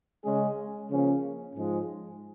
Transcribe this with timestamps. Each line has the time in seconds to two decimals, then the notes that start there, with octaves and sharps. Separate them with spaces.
0.24 C#3 G#3 C#4 G#4
0.91 C#3 F3 A#3 C#4
1.56 G#2 F3 G#3